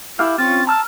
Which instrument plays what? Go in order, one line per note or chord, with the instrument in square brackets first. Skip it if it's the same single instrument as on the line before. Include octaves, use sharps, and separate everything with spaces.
[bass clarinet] E4 [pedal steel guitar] G4 A4 F5
[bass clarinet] C4 [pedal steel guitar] C#4 F4 [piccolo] A6
[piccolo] A5 [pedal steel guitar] A#5 E6 F6